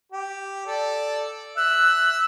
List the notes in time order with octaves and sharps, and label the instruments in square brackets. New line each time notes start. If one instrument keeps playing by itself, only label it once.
[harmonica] G4
A4 D5
[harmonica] E5 [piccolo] F#6